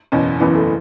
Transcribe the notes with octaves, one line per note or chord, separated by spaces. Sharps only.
F#1 E2 B2 C#4
F#1 E2 C#3 E3 B3
A3